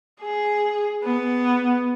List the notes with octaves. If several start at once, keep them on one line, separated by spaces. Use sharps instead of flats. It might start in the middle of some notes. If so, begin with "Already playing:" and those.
G#4
B3